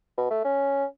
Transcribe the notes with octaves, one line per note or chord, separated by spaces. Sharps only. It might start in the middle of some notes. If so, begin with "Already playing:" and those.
B2
A3
C#4